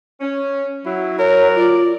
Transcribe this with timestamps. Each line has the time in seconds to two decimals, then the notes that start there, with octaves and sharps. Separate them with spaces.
0.20 C#4
0.85 F#3 E4
1.19 A#4 C#5
1.56 F4 D5